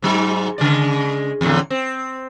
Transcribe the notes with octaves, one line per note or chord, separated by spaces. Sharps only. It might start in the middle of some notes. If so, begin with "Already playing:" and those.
G#2 F#3 D#4
C#3 G#3 D5
E2 A2 D3
C4